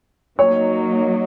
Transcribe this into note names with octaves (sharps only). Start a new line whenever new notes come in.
F#3 A#3 D#4 C#5